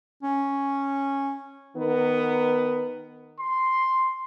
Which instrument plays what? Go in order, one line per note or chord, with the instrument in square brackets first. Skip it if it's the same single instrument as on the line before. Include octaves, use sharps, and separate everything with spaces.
[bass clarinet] C#4
[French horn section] D#3 B3 A#4 B4
[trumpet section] C6